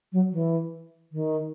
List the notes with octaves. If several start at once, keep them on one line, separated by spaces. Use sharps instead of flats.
F#3
E3
D#3